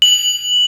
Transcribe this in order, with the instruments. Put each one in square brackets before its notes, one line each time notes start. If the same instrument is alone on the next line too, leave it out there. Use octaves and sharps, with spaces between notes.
[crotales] F#7